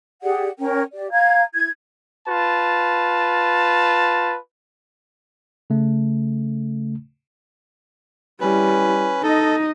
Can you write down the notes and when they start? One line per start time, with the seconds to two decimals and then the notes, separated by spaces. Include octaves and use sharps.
0.22 G4 G#4 D5 F#5
0.59 C#4 A#4 G5
0.94 G4 D5
1.11 F5 A#5 G#6
1.54 E4 G#6
2.28 F4 B4 A5
5.70 C#3 A3
8.41 G3 C#4 E4 B4
9.23 D#4 A4 D#5